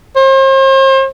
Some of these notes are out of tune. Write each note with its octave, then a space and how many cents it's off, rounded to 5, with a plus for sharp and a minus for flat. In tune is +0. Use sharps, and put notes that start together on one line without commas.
C5 +40